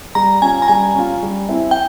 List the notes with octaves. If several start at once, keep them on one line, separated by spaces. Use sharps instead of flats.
G3 A#5
C#4 F4 G#5
A#5
G3 G#5
C#4 F4
G3
C4 E4
G5